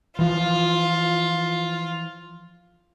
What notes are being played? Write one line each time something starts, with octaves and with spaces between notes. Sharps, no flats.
E3 F3 F4